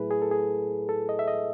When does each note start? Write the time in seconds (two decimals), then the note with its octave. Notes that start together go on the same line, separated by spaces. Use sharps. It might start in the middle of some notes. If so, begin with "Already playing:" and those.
Already playing: A2 F#3 A3 E4 G#4 B4
0.11 G#4
0.22 A4
0.31 G#4
0.89 A4
1.09 D#5
1.19 E5
1.28 D#5